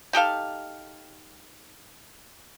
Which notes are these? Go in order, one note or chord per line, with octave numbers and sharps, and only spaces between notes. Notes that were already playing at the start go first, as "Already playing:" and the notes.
D#4 G4 A4 F5